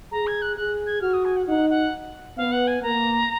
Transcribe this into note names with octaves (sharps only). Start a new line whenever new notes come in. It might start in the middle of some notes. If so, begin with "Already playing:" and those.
G#4 A#5
G#6
F#6
G#4 F#6
G#6
F#4 F6
D#6
G#5
F#5
D#4 F#5
F#5
B3 F5
F#5
G#5
A#3 A#5